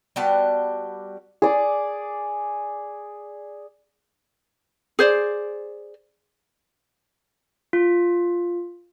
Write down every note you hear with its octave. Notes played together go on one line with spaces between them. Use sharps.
G3 B3 F#4 A5
G#4 D5
G#4 C5 D5
F4